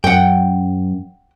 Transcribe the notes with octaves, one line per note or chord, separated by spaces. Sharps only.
F#2 F#5 G5